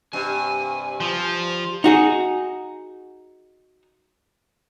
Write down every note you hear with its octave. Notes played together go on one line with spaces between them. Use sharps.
G2 C3 G#5
F3
D#4 F#4 G#4